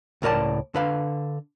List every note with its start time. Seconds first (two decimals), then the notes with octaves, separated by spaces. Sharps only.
0.22 C#2 A2 A#4 D5 A5
0.75 D3 B4 F5